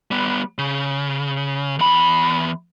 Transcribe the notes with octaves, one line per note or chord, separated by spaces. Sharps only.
G3 B3
C#3
E2 B5